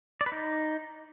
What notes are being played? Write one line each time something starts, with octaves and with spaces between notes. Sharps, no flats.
D5
B4
D#4